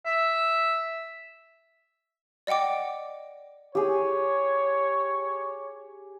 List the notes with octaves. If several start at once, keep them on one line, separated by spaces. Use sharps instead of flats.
E5
D5 D#5 F#5 G5 D6
G4 G#4 C#5